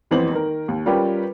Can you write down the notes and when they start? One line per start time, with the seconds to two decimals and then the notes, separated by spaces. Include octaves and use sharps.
0.11 D#1 F2 E3 B3 C5 F#7
0.31 D#3 A#4
0.68 D#2
0.86 G3 C#4 F4 G4 A#4 B4